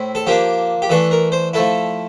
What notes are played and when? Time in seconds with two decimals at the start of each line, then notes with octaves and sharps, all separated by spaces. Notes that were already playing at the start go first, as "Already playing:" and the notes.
Already playing: A2 C4 E4
0.15 A4
0.27 F3 A#3 D4 G4
0.82 G4
0.90 E3 A3 D4 A4
1.11 A#4
1.32 C5
1.53 F3 A3 E4 A4